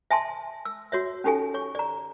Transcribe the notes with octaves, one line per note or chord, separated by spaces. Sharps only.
E5 G#5 A5 C6
E6
F#4 C#5 E5
C#4 D#4 G4 A4 G#5
C#5 C#6
D5 A#5